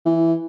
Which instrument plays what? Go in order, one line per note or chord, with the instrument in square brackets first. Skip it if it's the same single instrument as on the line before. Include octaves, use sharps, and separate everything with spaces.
[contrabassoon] E3